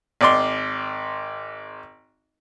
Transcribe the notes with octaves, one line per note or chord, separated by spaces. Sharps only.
G#1 D5 C6